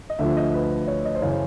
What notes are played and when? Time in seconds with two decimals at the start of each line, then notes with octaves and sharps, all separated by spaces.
0.10 D#5
0.19 D2 D3 F3 E5
0.37 D#5
0.54 B4
0.88 C#5
1.05 D#5
1.15 C5
1.22 F#2 C#3 E3 C#5
1.32 C5